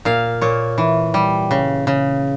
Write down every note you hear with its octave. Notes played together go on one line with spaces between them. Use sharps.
A#2 F5
A#2 C#5
E3
G3
C#3
C#3